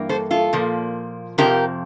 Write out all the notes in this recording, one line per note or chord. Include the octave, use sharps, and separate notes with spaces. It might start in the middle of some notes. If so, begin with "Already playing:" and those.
Already playing: G2 E3 A#3
A4 C5
F4 A4
A#2 F3 A#3
F2 C3 F3 G4 A#4